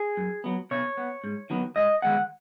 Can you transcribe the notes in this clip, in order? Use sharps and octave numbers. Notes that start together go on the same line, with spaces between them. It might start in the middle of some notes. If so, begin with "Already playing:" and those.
Already playing: G#4
F#2
F#3 B3
B2 C#5
B3
G#2
D#3 F#3 B3
G#2 D#5
D#3 G#3 B3 F#5